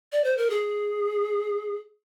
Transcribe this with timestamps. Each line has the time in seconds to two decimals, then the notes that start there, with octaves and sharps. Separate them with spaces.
0.12 D5
0.24 C5
0.37 A#4
0.50 G#4